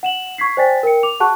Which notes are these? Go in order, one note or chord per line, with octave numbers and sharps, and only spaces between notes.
F#5 E7 F#7
C#6 G#6 B6 C7
C5 D5 G5 G#5 A6 B6
A#4 G5 C#7
D6 F7
F#4 G#4 F#5 A5 C#6 F#6